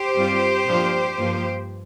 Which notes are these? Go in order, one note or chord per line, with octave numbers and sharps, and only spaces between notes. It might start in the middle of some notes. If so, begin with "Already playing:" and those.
Already playing: G4 C5
G2 G3 C4 F4
A#2 F3 D4 F4
G2 F3 A#3 F4